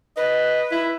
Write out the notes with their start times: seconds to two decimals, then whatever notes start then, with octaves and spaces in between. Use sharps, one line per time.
0.17 B4 D#5
0.71 E4